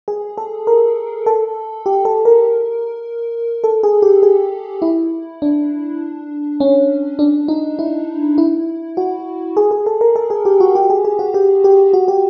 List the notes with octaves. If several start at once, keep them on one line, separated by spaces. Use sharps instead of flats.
G#4
A4
A#4
A4
G4
A4
A#4
A4
G#4
G4
G#4
E4
D4
C#4
D4
D#4
E4
E4
F#4
G#4
G#4
A4
A#4
A4
G#4
G4
F#4
G4
G#4
G#4
F#4
G4
G4
F#4
G4